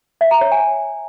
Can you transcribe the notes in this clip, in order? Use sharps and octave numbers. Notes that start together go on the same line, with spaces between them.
E5
A#5
C#5
G#5